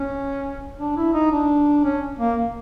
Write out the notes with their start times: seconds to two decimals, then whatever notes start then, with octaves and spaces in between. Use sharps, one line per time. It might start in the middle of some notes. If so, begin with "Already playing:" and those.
Already playing: C#4
0.79 D4
0.97 E4
1.14 D#4
1.32 D4
1.84 C#4
2.19 A#3